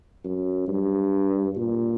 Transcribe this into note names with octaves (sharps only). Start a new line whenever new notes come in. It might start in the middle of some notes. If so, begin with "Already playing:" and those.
F#2
G2
A#2